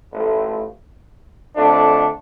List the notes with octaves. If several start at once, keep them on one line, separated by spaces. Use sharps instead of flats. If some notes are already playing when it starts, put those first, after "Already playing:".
A1 A2 F3 A3
F2 D3 A3 D4